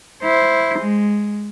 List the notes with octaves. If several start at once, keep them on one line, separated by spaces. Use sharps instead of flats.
E4 C5
G#3